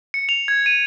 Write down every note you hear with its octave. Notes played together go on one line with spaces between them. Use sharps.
C#7
F7
G#6
D#7